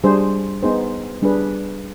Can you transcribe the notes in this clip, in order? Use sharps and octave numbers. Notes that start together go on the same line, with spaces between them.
G3 D4 G#4 C5
B3 D#4 G#4 C5
G3 D4 G#4 B4